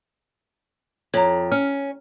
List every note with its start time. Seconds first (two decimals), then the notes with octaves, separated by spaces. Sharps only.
1.14 F2 C#5 A#5
1.52 C#4 F6